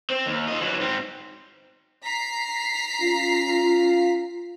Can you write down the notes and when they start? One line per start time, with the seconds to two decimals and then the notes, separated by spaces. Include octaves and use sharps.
0.10 C4
0.26 D#2
0.48 F4 D#5
0.60 E3 F#3
0.80 G#2 C4
2.04 A#5 B6 C7
3.00 C#4 F4